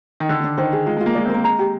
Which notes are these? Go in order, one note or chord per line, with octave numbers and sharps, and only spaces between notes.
D#3
D3 D4
D4
D#3 C5
G#4
G#3 F4
G#3
F4
A#3
G#3 D5
C4
A#3 A#4
G#3 A#5
G4